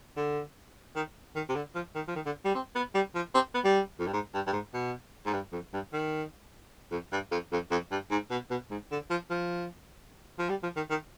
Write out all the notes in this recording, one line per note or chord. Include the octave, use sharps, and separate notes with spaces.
D3
D#3
D#3
C3
D3
F3
D#3
F3
D#3
D3
G3
C4
B3
G3
F3
C4
B3
G3
F2
G2
G#2
G2
G2
G#2
B2
G#2
G2
F2
G2
D#3
F2
G2
F2
F2
F2
G2
G#2
B2
B2
G#2
D3
F3
F3
F3
G3
F3
D#3
D#3